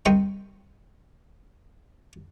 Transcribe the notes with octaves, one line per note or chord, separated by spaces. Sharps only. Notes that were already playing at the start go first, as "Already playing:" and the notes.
C2 C4 D#4 C5 G5 C#6